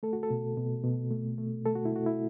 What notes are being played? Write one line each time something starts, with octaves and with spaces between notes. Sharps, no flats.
A3 A4
F#4
A4
B2
B2
B2
A3
A3
A3 A4
F#4
E4
A3 F#4
E4